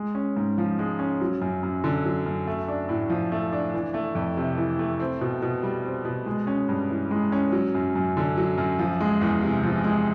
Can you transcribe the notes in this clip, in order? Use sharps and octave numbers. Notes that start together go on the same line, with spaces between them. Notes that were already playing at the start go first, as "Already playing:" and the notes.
Already playing: G#3
C#4
G#2
F3
G#3
C#4
F#3
F#2
F#2
D3
F#3
F#2
A3
D4
A2
F3
A3
D4
E3
A3
F2
C3
E3
A3
C4
B2
B2
G3
C4
B2
G#3
C#4
G2
E3
G#3
C#4
F#3
F#2
F#2
D3
F#3
F#2
F3
G#3
E2
C3
F3
G#3